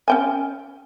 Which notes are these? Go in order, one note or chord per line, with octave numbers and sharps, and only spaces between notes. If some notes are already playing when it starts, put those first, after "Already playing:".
C#4 G5 G#5